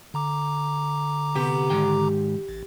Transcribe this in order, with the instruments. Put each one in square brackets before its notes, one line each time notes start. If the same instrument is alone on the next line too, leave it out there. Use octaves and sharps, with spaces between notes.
[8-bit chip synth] D3 A#5 D6
[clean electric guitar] C3 B3 [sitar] G4
[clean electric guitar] G#2 D#3 G5
[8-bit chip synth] A1